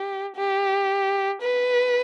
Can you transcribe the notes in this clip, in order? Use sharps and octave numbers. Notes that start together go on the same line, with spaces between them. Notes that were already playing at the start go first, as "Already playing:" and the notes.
Already playing: G4
G4
B4